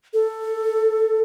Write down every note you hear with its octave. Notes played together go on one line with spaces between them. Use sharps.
A4